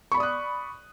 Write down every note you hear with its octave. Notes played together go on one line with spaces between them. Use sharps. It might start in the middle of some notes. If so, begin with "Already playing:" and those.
D5 B5 C#6 D#6 F#6